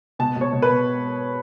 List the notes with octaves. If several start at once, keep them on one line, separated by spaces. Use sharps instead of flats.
B2 A5
B2 C#5
B2
B4
B2